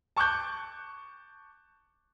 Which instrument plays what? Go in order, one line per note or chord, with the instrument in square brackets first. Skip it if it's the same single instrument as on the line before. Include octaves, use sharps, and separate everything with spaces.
[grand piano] A5 C#6 D6 F#6 G6